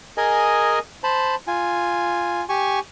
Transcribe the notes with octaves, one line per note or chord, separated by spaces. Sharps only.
G#4 A#4 D#5 G#5
C5 A5 B5
F4 G#5
G4 G#5 C#6